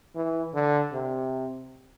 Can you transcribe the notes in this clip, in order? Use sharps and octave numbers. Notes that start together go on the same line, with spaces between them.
E3
D3
C3